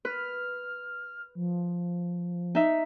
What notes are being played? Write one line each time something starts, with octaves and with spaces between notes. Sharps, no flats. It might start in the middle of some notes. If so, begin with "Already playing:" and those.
B4 F6
F3
D#4 E5